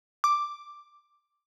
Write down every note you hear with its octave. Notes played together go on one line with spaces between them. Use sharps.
D6